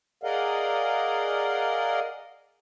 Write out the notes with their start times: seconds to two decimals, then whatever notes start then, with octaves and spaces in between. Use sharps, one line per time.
0.23 G#4 A#4 D5 D#5 F5 F#5